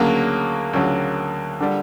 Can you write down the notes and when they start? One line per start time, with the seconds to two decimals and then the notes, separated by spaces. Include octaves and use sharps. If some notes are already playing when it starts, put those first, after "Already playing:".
Already playing: D2 C#3 F#3 A#3
0.73 D2 C#3 F#3
1.60 D3 G3